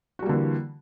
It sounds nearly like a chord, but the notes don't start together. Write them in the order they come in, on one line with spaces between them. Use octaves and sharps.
F#4 G3 A#3 D3 E3